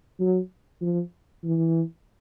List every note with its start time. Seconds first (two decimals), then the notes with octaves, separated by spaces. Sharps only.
0.19 F#3
0.81 F3
1.44 E3